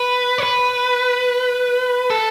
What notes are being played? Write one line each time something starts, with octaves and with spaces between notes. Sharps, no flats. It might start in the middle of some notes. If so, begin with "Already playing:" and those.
Already playing: B4
C#5
B4
A4